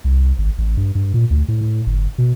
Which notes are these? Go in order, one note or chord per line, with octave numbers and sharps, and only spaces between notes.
C2
G#1
A1
G2
G2
A#2
D2
A2
A2
G1
B2